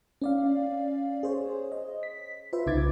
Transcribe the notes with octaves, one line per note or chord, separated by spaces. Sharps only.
C#4 D5 F5
G#4 C5 C#5
D#5
B6
F4 B4 C5 E5
C2 C#3 D#4 D6 G#6 A6